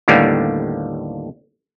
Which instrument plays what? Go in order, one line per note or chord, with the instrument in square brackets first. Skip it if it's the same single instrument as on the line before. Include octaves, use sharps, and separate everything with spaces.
[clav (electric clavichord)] D#2 A2 D3 G3 A#3 B3